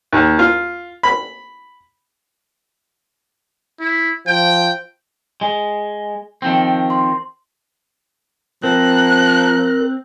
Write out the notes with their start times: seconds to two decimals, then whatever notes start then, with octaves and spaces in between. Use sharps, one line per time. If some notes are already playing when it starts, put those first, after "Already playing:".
0.13 D#2
0.39 F4
1.03 B5
3.80 E4
4.27 F3 G5
5.41 G#3
6.42 D#3 F3 C4
6.90 C6
8.63 F3 C4 A#4 F#6